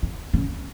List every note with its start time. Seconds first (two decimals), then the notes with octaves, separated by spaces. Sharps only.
0.03 C3
0.33 C#3